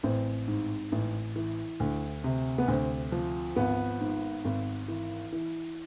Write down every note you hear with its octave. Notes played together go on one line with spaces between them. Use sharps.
A1 C4
G#2
A1
E3
D2
C3
B3
D2 C4
F3
G#1 B3
G#2
G#1
E3
E3